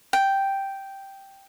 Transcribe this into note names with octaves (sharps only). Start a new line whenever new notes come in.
G5